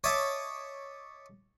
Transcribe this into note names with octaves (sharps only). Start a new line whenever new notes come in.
C#5 D#5 E5 A5 D6 D#6